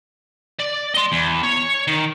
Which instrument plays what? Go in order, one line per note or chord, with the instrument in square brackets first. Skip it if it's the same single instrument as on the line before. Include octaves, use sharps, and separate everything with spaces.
[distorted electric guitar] D5
D#5 C6
E2
C#5
D#3